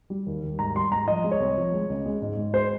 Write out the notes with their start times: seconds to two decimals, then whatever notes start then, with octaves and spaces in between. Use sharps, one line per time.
0.10 G3
0.26 D#2
0.43 D#2
0.59 G#2 A#5
0.75 G3 C6
0.91 G#2 A#5
1.08 F3 D#5
1.24 G#3
1.31 C#5
1.40 C2
1.57 F3
1.73 G#3
1.90 C#2
2.06 G#3
2.22 G#2
2.37 G#2
2.53 G#3 C5